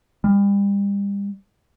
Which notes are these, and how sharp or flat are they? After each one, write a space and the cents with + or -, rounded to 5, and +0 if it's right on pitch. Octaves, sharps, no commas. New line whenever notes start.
G3 +35